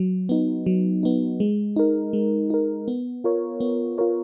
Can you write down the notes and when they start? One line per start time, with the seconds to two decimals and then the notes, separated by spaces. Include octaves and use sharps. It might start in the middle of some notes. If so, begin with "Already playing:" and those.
Already playing: F#3
0.29 B3 D#4
0.66 F#3
1.03 B3 D#4
1.40 G#3
1.76 D#4 A#4
2.13 G#3
2.50 D#4 A#4
2.88 B3
3.24 F4 A#4 C#5
3.60 B3
3.98 F4 A#4 C#5